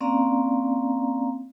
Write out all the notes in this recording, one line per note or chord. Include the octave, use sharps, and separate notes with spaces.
A#3 C4 C#4 D5 F5 A#5